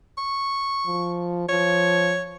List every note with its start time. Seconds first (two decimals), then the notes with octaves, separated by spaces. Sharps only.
0.18 C#6
0.87 F3
1.49 F3 C#5